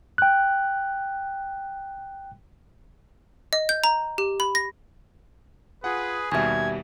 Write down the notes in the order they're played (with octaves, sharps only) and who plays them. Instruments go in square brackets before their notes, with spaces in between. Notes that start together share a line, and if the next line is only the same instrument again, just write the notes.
[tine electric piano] G5 F#6
[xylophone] D#5
G6
A#5
G4
B5
A#6
[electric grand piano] F4 F#5 [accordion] G#4 [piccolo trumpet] B4
[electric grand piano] D#2 B2 G3 [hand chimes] E5 G#5 [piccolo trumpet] G#6